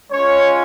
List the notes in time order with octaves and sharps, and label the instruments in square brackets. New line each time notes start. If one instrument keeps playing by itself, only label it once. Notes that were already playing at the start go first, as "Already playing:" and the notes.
[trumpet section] G#3 C#4 F4 C#5